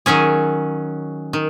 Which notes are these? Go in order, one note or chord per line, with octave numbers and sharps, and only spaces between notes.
D#3 F#3 C#4 G#4
D#3